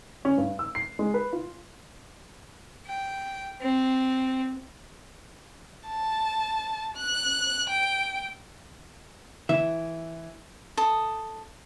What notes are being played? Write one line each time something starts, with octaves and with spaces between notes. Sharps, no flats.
C#4
G2
E6
C7
G#3
B4
F4
G5
C4
A5
F#6
G5
E3 E5
A4 D#6